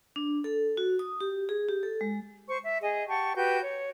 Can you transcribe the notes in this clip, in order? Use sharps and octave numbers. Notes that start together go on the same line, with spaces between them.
D4
A4
F#4
D#6
G4
G#4
G4
A4
G#3
C5 C#6
E5
G#4 D#5
G4 F#5 A5 C#6
F#4 G4 B4 G6
C#5